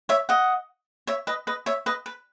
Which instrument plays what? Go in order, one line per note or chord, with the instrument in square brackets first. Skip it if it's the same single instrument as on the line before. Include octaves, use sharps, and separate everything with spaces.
[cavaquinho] C#5 E5
D#5 F#5
C#5 E5
B4 D#5
B4 D#5
C#5 E5
B4 D#5
B4